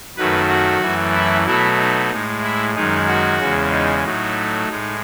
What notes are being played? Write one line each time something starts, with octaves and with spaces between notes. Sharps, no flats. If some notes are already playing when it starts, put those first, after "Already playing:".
F#2 D#3 F#3 A3 B4
F#4
F#2 E3 A3
E4
B2 F#3 A3 E4
D#4
A2 G#3
E4
F#2 D#3 G#3 D#4
F#4
E2 C#3 G#3
D#4
A2 F#3 A3 D#4
A2 G#3